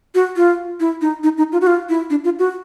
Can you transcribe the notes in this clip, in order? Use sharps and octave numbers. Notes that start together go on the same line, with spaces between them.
F#4
F4
E4
D#4
D#4
D#4
F4
F#4
F4
E4
D4
F4
F#4